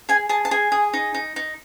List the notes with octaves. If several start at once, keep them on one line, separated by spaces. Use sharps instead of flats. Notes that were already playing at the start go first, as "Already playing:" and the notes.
G#4 G#5
G#4 A5
A5
G#4 G#5
G#4
D#4
D#4
D#4